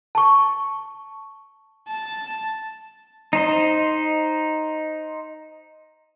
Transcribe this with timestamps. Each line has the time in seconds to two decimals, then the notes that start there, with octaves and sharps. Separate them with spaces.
0.15 A5 C#6
1.89 A5
3.33 D#4 C5 D#5